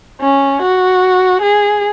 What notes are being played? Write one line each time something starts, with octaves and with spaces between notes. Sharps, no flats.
C#4
F#4
G#4